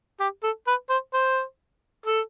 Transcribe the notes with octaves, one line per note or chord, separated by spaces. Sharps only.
G4
A4
B4
C5
C5
A4